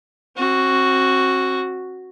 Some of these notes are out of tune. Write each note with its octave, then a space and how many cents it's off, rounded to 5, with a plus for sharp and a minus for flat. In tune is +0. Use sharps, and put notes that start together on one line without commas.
C4 +35 F#4 +0